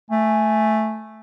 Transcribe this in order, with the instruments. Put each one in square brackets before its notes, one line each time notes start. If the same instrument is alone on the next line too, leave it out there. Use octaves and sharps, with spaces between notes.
[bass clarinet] A3 [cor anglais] G#5